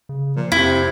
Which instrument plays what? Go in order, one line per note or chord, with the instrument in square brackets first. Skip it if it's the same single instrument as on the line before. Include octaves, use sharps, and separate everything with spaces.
[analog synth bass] C#3
[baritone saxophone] A#2 [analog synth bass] F3
[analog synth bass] F2 [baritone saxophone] C3 [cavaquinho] E4